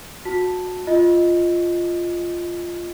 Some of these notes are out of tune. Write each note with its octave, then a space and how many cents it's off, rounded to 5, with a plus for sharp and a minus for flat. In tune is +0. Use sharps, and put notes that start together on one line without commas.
F#4 -25 A5 +5
F4 -5 D#5 +0